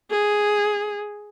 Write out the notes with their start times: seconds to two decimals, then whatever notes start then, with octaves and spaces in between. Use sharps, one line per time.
0.11 G#4